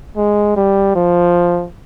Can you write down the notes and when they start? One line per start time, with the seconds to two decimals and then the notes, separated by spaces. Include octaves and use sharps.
0.17 G#3
0.56 G3
0.95 F3